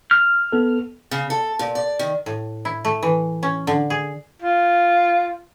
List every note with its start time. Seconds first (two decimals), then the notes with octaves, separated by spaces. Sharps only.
0.11 F6
0.52 B3 A4
1.11 C#3
1.30 A4
1.59 A#2
1.75 D5
1.99 D#3
2.26 A2
2.65 E4
2.85 A3
3.03 E3
3.43 C#4
3.67 D3
3.90 G#4
4.42 F4